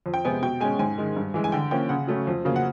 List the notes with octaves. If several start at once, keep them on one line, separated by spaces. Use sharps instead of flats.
F2
G5
C3 F3 G#3 B3 G#5
B2 G5
G#3 C#4 G#5
G#2 G#5
D#3 G#3
G2
E3 G#3
G#5
D3 G5
F3 A#3 C#4 G5
C#3 F#5
F#3 A3 C#4
F2
C#3 F#3 A#3
F#5